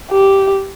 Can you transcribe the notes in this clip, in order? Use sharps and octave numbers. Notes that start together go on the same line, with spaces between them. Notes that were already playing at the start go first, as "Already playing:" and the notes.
G4